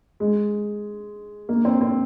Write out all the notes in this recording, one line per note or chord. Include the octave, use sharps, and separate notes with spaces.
G#3
A#3
C4
C4